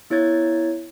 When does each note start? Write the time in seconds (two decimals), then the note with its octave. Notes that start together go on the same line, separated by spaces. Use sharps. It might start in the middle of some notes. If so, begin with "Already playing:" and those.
0.10 B3 E4 C#5 G#6 A6